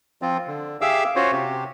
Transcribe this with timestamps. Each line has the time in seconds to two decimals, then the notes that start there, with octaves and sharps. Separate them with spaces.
0.22 F3 C4 F4
0.47 D3
0.81 G4 G#4 E5 F5 D6 E6
1.16 C#4 F4 F#4 C5 C#5
1.32 C3 G4